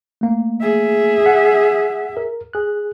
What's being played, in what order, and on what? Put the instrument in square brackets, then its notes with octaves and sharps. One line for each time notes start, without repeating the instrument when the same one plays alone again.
[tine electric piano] A3 A#3
[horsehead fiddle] G#4 E5
[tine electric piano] F#5
A#4
G#4 F#6